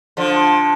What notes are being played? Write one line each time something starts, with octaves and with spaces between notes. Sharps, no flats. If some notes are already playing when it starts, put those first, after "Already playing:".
D3 F3